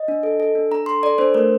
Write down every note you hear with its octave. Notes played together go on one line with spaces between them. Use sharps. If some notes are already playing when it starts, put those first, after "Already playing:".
Already playing: D#5
D4
A4
A4
D4
D4 A#5
A4 C6
A4 D5
D4 C5
A3 A#4